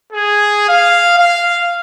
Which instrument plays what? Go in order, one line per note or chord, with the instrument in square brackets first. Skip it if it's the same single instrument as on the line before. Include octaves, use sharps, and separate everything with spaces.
[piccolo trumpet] G#4
F5
F5